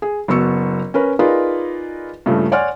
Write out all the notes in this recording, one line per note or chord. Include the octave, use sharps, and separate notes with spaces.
G#4
F#1 B3 F#4 C#6 E6 C#7
C#4 A#4 B4
D#4 F4 G#4 A#4 B4 D5
G2 A#2 C#3 A3
C#5 D5 F#5 G#5 C6 F6